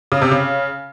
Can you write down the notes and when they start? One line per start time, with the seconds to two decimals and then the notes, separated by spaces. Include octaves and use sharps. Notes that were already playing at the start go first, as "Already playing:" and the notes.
0.12 C#3
0.22 C3
0.31 C#3